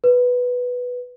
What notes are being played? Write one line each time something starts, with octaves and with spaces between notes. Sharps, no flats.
B4